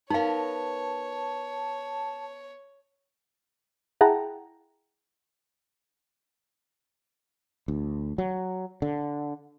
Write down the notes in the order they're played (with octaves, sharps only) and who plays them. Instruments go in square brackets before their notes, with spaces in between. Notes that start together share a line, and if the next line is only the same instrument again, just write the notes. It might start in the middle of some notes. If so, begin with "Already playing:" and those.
[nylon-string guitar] B3 A#4 [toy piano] D#4 F5 [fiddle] C#5 [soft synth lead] A5
[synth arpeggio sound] E4 G#4 F#5 G5 A5 A#5
[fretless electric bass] D2
F#3
D3